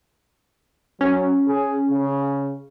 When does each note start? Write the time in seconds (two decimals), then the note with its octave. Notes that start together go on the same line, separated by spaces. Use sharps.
1.01 F#3 C#4
1.47 G#4
1.90 C#3